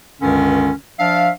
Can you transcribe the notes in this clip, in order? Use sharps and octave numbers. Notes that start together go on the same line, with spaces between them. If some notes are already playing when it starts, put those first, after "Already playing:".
C#2 G2 D3 D#3 C#4
F3 D4 E5 F5